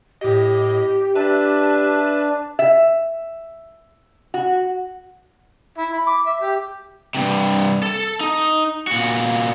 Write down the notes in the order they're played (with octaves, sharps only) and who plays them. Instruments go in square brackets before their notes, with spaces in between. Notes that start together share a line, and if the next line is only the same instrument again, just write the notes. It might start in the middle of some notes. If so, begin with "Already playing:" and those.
[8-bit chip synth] A2 D#5 [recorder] G4
[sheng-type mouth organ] D4 [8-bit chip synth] B4 A5 [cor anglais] E5
[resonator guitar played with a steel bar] E5
F#4
[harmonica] E4
B5
D6
E5
G4
[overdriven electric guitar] G2 C3
A4 A5
D#4
A#2 F#4